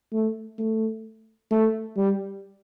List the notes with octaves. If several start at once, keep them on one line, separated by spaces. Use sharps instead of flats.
A3
A3
A3
G3